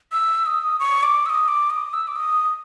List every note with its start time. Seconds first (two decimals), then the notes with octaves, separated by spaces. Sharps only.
0.12 E6
0.46 D#6
0.80 C#6
1.03 D6
1.26 E6
1.30 D#6
1.48 D6
1.70 D#6
1.93 E6
2.08 D6
2.16 D#6